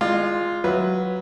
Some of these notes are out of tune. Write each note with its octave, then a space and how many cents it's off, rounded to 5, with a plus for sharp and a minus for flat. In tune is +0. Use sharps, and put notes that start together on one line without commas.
G#3 +0 F4 +0 D5 +40
F#3 +0 B4 +0 E5 +0